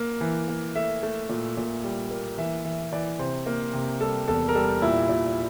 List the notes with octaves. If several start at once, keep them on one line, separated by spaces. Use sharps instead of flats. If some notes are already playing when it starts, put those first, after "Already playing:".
Already playing: A#3
E3
A#3
A3 E5
A3
A#2
A#2
G3
A#3
E3 E5
E3 E5
E3 D5
C3 C5
A#3
C3
G3 A4
E2 A4
A#4
G3 A4
A#2 E4
A#2